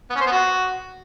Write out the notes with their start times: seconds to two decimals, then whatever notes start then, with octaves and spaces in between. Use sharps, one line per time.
0.10 B3
0.15 C#4
0.21 C5
0.26 B3
0.32 F#4